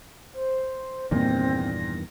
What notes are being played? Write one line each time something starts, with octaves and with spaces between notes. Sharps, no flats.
C5
E2 G2 A#2 D#3 C4 A#6